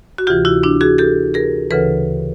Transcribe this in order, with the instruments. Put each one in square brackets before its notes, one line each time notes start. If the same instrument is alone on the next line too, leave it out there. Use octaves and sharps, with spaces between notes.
[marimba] F#4
D2 C3 E3 F4 G4
E4 F#4
D4 E4
F#4 G#4
G4 A4
G#4 A#4
D2 C#3 E3 A4 B4